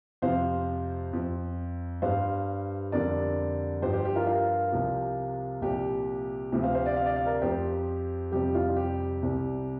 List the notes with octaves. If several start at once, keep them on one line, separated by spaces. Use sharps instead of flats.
F2 C3 F3 C5 F5
F2 F3
G2 G3 C5 F5
F2 D3 G3 A#4 D5
G2 F3 G4 C5
G4 C5
G4
F4 A#4
F4 A#4
C2 C3 F3
C2 A#2 F3 G4
D2 C3 F3
C5 F5
C5 F5
D5
F5
D5
F5
A#4 D5
F2 F3 G4 C5
F2 C3 G3 G4
F4
F4
G4
C2 C3 G3